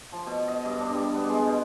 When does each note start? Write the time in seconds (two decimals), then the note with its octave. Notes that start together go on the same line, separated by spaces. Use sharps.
0.12 F3
0.27 B2
0.48 D#5
0.65 G2
0.81 D4
0.94 G3
1.15 B3
1.29 G#3
1.47 B2